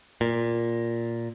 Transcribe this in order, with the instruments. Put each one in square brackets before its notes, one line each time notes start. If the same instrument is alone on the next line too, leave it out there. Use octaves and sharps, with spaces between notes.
[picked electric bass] A#2